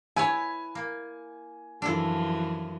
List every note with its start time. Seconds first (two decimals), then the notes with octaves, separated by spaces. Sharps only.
0.16 E4 B4 C#5 G#5
0.75 A#3
1.82 F#2 E3 F3 D4 A4